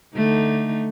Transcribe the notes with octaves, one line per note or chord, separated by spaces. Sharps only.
D3 A3 D#4